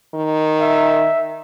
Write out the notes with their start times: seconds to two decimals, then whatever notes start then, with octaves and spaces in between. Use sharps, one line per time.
0.14 D#3
0.61 E5